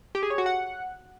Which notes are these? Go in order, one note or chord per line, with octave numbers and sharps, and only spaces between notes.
G4
G#4
C#5
F#4
F#5